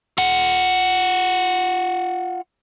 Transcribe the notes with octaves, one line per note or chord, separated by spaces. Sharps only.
F4 F#5